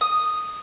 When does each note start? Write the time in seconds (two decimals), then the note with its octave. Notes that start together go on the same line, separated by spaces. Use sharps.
0.01 D#6